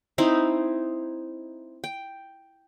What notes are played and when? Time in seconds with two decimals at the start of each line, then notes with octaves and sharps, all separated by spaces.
0.18 C4 D#4 E4 C5
1.84 G5